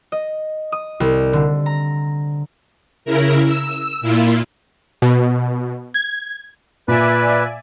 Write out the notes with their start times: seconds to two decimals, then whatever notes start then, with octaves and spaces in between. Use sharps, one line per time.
0.12 D#5
0.72 D#6
1.00 C2
1.33 D3
1.66 A#5
3.05 C#3 E4 A#4
3.45 E6
4.01 A#2 E4 F4
5.02 B2
5.94 G#6
6.88 A#2 B4 D5 E5 G#5